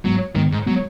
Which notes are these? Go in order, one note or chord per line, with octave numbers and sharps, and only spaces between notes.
G#2 F#3 G#3 B3
G#2 D#3 G#3 B3
G#2
F#3 G#3 B3